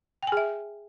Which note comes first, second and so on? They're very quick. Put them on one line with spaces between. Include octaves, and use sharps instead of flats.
G5 G#5 G#4 E5